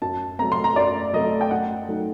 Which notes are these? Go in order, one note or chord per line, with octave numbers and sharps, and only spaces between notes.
F#2 A5
F#3 A3 C4 A#5
C6
A#5
F#2 D5
F#3 A3 C4 D#5
G5
F#2 F#5
F#3 A3 D#4